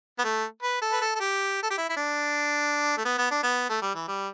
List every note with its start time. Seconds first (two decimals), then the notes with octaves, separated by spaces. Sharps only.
0.19 B3
0.24 A3
0.63 B4
0.82 A4
0.92 B4
1.01 A4
1.15 A4
1.20 G4
1.63 A4
1.70 G4
1.78 E4
1.90 E4
1.97 D4
2.98 A3
3.05 B3
3.18 B3
3.31 D4
3.43 B3
3.69 A3
3.82 G3
3.95 E3
4.08 G3